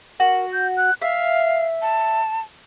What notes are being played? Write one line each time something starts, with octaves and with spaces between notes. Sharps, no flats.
F#4 A#4
G6
F#6
E5 F5
A5